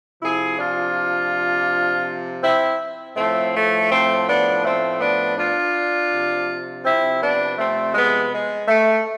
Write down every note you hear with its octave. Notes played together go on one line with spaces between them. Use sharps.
C3 F3 E4 G#4
D4 F4
C4 E4
A2 F3 A3 C4
A3
A3 C4
B3 D4
A3 C4
B3 D4
D4 F4
C3 F3
C4 E4
B3 D4
A3 C4
G#3 B3
G#3
A3